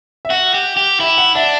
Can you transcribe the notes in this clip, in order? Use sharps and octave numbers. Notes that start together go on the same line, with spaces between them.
E5
F#4 F#5
G4
G4
E4 E5
F#5
D4 E5